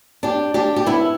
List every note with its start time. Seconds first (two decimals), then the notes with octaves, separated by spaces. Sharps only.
0.23 D4 G4
0.54 D4 G4
0.76 G4
0.86 B3 E4